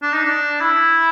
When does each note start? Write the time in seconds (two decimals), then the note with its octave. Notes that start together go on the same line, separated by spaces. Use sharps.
0.02 D4
0.13 D#4
0.25 D4
0.60 E4